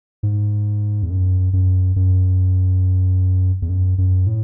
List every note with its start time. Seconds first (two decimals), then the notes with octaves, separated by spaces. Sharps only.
0.23 G#2
1.03 E2
1.10 F#2
1.53 F#2
1.96 F#2
3.62 E2
3.69 F#2
3.98 F#2
4.27 A2